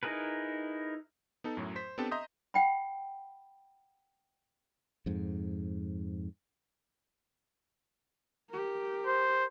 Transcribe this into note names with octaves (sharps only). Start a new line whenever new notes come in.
D#4 E4 G#4 A#4 B4
B3 D#4 A4
F#2 A2 F#3
C5 B6
B3 C4 D4 G4 A4 A5
D#5 E5 A#5 C6 D#6 G6
F#5 G5 B5
F2 G#2
G4 A#4
C5